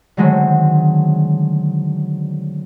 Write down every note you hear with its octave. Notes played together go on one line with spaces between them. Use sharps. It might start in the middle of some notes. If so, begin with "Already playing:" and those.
D3 D#3 F#3 G#3 A3 C4